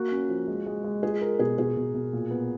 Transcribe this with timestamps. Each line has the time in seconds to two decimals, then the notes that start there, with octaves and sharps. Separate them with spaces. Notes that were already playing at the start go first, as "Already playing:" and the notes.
Already playing: A#3 F#4
0.12 C#4
0.29 F3
0.48 G#3
0.66 G#3
0.84 G#3
1.03 F4 G#4
1.21 F4 A#4
1.39 B2 G#4
1.58 B2 G#4
1.77 B2
1.94 B2
2.13 A#2
2.31 B3